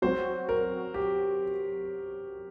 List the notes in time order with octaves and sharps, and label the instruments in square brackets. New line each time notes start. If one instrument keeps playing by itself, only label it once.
[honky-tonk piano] F#3 C4 F#4 [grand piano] C5
[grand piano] A#4
G4